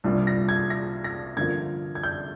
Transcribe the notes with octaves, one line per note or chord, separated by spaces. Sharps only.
C2 A#2 G3 D4 F4
A#6
G#6
A#6
A#6
G2 D3 F3 A#3 F4 G#6
G#6
G6